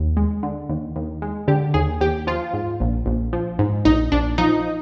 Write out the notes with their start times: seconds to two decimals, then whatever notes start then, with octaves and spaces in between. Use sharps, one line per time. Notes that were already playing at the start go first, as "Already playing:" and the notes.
Already playing: D#2
0.17 G#3
0.43 D3
0.69 D#2
0.96 D#2
1.22 G#3
1.48 D3 G4
1.74 D#2 G#4
2.01 D#2 G4
2.27 F3 F4
2.53 G#2
2.80 A#1
3.06 A#1
3.33 F3
3.59 G#2
3.85 A#1 D#4
4.12 A#1 D4
4.38 F3 D#4